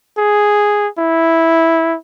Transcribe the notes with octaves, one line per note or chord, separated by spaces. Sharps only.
G#4
E4